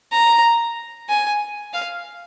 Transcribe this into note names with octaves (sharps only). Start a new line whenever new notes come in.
A#5
G#5
F5